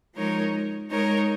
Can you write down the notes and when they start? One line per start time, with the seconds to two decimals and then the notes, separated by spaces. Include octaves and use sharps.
0.14 F3 G#3 D#4 A#4 C#5
0.90 G#3 D#4 A#4 C#5